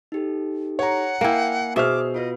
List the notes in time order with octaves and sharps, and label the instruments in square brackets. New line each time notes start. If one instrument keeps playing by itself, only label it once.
[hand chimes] D#4 G4 A4
[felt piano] C#5 A#5 [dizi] F#5
[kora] A#3 E4 [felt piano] F5 G5 [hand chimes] G#5 C7
[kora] B2 E5 [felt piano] G#4 C5 F6 [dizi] D6
[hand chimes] F4 F#4 B4 [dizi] D#5